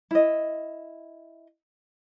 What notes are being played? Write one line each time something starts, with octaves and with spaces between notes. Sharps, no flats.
E4 D#5